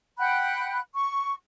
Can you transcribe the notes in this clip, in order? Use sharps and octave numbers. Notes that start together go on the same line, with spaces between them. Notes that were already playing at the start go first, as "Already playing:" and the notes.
F#5 G5 B5 F#6
C#6